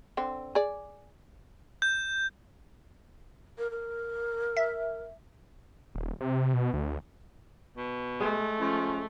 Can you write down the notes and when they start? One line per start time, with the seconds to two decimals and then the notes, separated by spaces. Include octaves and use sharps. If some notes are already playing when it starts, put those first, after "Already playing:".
0.17 D3 C4
0.55 G#4 D5
1.82 G6
3.58 A#4
3.71 A#4
4.57 E5
5.95 D#1
6.21 C3
6.54 B2
6.74 D2
7.77 B2
8.20 G#3 A3
8.60 F3 C#4